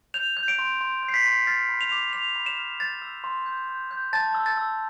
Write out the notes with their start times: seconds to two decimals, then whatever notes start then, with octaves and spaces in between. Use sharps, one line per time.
0.14 G6 F7
0.37 G6
0.48 D7
0.59 C6
0.81 C6
1.03 G6
1.08 C7
1.14 B6
1.25 C6
1.47 F6 A6
1.69 B5
1.81 F7
1.92 D6
2.13 D6 F7
2.36 B5
2.46 E7
2.58 F6
2.80 G6 A6
3.02 E6
3.24 C6
3.46 G6
3.69 G6
3.91 G6
4.13 A5 A6
4.35 E6
4.46 A6
4.57 E6